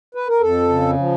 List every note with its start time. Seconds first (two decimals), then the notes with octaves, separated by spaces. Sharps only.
0.15 B4
0.28 A#4
0.41 F2 A4
0.69 C#3
0.97 F3